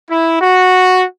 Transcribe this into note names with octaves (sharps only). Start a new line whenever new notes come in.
E4
F#4